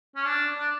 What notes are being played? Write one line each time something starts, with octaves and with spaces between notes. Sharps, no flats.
C#4
D4
D4